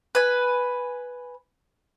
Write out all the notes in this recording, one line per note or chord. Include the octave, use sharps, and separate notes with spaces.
B4 G#5